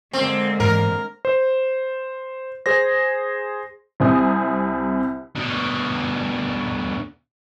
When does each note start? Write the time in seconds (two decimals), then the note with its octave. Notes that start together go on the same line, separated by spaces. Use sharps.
0.13 D3 G#3 A#3 C4
0.60 G#2 E3 A#4
1.25 C5
2.66 G#4 C5 A#6
4.00 C2 C3 C5 G#5 D#6
5.36 B2 D3